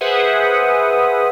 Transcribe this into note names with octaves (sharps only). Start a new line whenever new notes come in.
G#4 B4 C5 E5 F#5 D#6